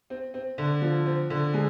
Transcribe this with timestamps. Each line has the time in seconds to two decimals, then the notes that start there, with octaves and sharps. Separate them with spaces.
0.10 C4
0.34 C4
0.58 D3
0.82 F3
1.06 C4
1.30 D3
1.54 G#3